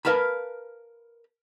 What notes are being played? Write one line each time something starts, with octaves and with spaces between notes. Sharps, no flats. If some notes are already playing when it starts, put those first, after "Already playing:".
A#4 B4 F5 A5 B5